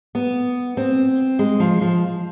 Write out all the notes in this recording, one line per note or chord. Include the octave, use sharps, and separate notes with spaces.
B3
C4
G#3
F3
F3